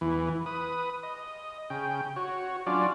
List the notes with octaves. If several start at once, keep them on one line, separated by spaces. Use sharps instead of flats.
E2 E3
B4 D#6
D#5
C#3 G5
F#4 C#5
F#3 C#4 D4 F4 D5